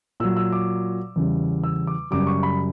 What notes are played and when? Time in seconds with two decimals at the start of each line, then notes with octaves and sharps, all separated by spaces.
0.20 A#2 F#3 E6
0.37 E6
0.52 D6
1.16 E2 C#3 G3
1.64 E6
1.87 D6
2.11 F#2 C#3 G3 D6
2.27 C#6
2.43 B5